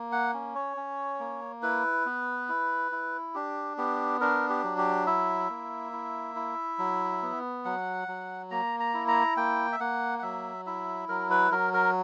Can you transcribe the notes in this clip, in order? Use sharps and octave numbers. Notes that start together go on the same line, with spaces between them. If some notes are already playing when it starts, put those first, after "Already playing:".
Already playing: A#3
F#5
C#4
C#5
C#4
A#3
E4 B4
B3
E4
E4
D4 G4
B3 G4
D4 A#4
G4
F#3
G4
E4 E5
A#3
E4
E4
F#3
B3
F#3 F#5
F#3
A#3 A#5
A#5
E4
A#5
A#3 G5
E5
A#3 F#5
F#5
F#3 E5
E4 E5
F#3 A#4
B4
F#3 A#4
A#4